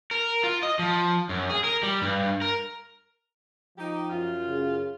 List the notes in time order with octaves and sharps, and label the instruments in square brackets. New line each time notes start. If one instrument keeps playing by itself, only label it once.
[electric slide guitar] A#4
F4
D#5
F3
F#2
G#4
A#4
G3
G2
A#4
[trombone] F3 [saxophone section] D#4 G4
[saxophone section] F#2 F4
[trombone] C#3